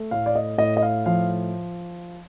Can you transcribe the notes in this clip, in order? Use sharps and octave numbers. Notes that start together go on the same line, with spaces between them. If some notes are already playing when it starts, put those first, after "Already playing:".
Already playing: A3
A2 F5
D5
D#5
A2 D#5
D#5
F5
F3 F5